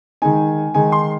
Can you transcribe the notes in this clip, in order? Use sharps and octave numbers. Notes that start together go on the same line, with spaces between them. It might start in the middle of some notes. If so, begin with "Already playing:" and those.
D#3 G#3 D#4 G#5
D#3 G#3 D#4 G#5
C6